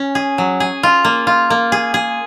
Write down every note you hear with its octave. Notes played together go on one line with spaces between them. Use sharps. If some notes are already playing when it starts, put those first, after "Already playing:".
Already playing: C#4
G#4
F#3
G#4
F4
A#3
F4
A#3
G#4
G#4